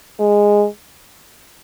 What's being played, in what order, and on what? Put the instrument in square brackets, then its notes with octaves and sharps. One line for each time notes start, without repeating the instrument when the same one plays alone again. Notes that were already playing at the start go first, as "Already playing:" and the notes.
[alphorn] G#3